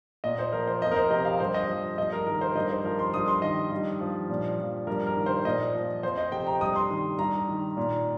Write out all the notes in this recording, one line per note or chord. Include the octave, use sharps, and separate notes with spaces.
A#2 D#5
C5
F3 A#4
C5
F2 D#5
A#4
C5
C3 D#5
F5
G2 C5
D#5
F3
G2 D#5
A#4
D#3 A#4
C5
G2 D#5
C5
F3 A#4
C6
G2 D#6
C6
D#3 D#5
G2
F3
A#2
F3
G2 A#4
A#4
D#3
C5
A#2 D#5
F3
F2 C5
D#5
C3 G5
A#5
G2 D#6
C6
D#3
G2 A#5
D#3
A#2